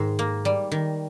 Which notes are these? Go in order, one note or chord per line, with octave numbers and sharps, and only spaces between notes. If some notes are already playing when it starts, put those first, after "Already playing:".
Already playing: G#2 D#3
A#3
G3
D#3